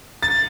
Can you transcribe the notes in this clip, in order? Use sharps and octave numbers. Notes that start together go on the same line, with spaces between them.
A6